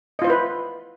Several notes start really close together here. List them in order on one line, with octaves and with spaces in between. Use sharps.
D#5 F4 C5 E4 B4